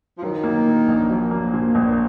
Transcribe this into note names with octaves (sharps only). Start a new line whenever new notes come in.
F3
D#3 F#3
A#3
A#2
A#1
F3 F#3
A#3
A#2
A#1